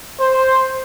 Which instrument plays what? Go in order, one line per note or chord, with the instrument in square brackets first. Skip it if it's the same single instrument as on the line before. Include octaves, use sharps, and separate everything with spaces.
[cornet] C5